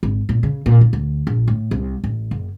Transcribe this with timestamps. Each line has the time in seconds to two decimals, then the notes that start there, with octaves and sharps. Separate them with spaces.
0.03 G#1
0.29 A#2
0.43 C#3
0.66 A#2
0.81 E4
0.93 D2
1.27 A#1
1.48 A2
1.71 C2
2.04 A1
2.31 F#1